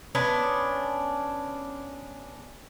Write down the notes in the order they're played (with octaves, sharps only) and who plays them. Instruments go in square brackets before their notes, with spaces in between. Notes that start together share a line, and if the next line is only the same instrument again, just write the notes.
[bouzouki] B3 C#4 D4